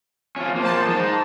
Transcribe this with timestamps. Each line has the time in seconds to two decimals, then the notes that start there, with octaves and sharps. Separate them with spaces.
0.36 F3 C#4 F4
0.56 F3 A#3 C5 A5
0.87 G#3 D#4